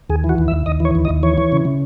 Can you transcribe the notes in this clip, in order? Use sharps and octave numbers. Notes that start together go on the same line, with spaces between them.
D#2 G#4
E3
F#4
D#2
E5
D#2
D#2 D#5
E3
C#5
D#2
D#5
D#2
E3 C#5
E3
C#3
C#3